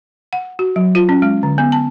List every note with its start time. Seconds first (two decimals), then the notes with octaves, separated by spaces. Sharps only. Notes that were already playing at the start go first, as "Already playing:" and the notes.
0.33 F#5
0.59 F#4
0.76 F#3
0.95 F4
1.09 C#4
1.22 G#3
1.43 D3
1.58 B3
1.72 A5